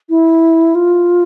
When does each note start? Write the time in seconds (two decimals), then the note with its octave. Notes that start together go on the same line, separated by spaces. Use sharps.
0.10 E4
0.75 F4